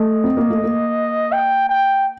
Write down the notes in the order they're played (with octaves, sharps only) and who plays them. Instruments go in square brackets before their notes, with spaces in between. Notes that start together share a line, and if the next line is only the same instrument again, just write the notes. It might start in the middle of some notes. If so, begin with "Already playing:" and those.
Already playing: [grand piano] A3 [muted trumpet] D#5
[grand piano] C4
A#3
A3
A#3
[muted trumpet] G5
G5